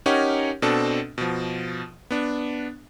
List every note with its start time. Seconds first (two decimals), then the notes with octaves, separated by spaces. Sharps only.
0.06 C#4 D#4 G4 A#4 C#5 F#5
0.62 B2 C4 D4 A4
1.18 B2 F3
2.11 B3 D4